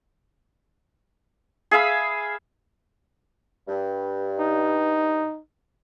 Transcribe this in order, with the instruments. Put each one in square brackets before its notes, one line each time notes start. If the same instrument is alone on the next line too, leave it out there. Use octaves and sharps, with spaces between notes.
[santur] G#4 E5 F5 B5
[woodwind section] G2
[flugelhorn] D#4